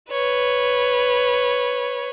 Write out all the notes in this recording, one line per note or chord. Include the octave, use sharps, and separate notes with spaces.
B4 C#5